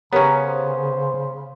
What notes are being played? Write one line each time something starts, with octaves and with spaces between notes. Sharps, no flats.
C#3 B3 C#4 G4 A#4 C#5 A#5
C5